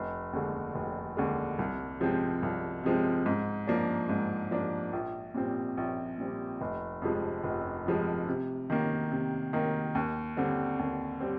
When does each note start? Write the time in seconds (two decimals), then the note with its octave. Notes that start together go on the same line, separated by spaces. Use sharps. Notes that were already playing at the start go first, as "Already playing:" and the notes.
Already playing: F1
0.33 D#2 D3 G#3
0.75 F1
1.17 D#2 D3 G#3
1.59 C2
2.00 C3 F3 G#3 C4
2.43 C2
2.84 C3 F3 G#3 C4
3.26 G#2
3.67 F3 A#3 D4
4.09 G#2
4.51 F3 A#3 D4
4.93 A#1
5.35 A#2 G3 C4
5.77 A#1
6.18 A#2 G3 C4
6.61 F1
7.02 F2 C3 F3 G#3
7.43 F1
7.86 F2 C3 F3 G#3
8.28 C3
8.70 D#3 A#3
9.12 C3
9.53 D#3 A#3
9.95 D#2
10.36 D3 G3 C4
10.79 D#2
11.20 G3 C4